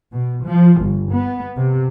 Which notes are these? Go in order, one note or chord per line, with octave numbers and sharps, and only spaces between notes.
B2
F3
G1
B3
C3